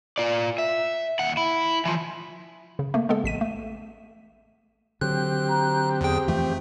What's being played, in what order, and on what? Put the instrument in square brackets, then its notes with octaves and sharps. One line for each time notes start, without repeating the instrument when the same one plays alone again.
[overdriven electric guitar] F4 D5
E5
D#2 F#5
E4
E3 F3
[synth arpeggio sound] C#3
A3 A#3
G#3 B3 A4
A1 B6 D#7
A3
[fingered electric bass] D3 F#3 [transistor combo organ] C4 G4 [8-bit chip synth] F#6
[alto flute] A#5
[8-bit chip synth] E2 G5 [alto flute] G#4
[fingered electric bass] F2 E3 F3 [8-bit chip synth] A3 [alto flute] G5